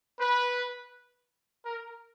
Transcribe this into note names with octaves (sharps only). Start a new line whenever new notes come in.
B4
A#4